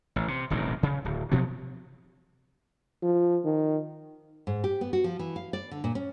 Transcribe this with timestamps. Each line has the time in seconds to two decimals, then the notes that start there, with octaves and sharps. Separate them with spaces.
0.16 A1
0.28 C3
0.50 D#1 A1 C3 D#3
0.83 C#3
1.05 D1
1.32 B2 F3 F#3 B3
3.03 F3
3.45 D#3
4.47 G#2
4.64 G4
4.81 B3
4.93 F#4
5.04 F3
5.19 E3
5.36 F5
5.53 D5
5.71 D3
5.84 A#2
5.95 C#4